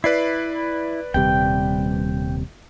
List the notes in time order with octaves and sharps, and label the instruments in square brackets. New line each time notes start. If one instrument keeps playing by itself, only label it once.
[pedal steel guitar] E4 [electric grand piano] B4 D5 C7
[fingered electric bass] D#1 C3 G3 [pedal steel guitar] G5